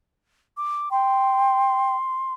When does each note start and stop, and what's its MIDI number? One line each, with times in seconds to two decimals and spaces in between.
0.57 0.89 86
0.91 1.96 79
0.91 2.34 84